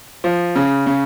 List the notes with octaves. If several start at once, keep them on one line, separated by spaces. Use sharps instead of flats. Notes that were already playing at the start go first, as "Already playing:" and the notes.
F3
C#3
C#3